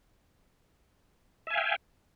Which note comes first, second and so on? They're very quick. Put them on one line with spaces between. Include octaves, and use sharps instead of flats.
E5 G#5 F5 G5